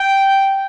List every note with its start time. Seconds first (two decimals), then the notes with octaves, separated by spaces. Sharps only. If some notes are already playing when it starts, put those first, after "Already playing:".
Already playing: G5